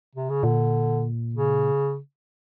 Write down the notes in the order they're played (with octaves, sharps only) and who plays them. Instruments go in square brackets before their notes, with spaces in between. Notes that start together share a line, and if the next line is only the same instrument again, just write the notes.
[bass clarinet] C3
C#3
[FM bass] A#2 [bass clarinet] D3
[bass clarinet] C#3